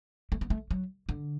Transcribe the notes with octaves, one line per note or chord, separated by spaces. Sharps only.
A3
B3
A3
F#3
D3